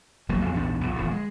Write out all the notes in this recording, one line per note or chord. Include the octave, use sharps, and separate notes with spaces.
E1 A1 F#3 A#3
B1 F2 B2 F#3
A#1 E2 G#2 D4
B1 E2 A#2
D1 E2 A#2 D3
G#3